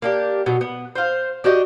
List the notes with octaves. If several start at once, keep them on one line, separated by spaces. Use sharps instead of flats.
A#3 D4 G4
B2 F#3
B3
C5 F5
D4 F#4 G4 D#5